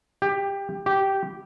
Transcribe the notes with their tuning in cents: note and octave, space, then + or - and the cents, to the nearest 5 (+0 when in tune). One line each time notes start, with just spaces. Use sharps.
G4 +15
G4 -10